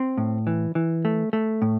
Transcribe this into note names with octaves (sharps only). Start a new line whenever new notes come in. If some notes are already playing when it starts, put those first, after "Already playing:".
Already playing: C4
A2
E3
E3
A3
A3
A2